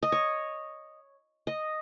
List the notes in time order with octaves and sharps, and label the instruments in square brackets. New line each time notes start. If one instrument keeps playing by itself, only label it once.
[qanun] D#5
C#5
D#5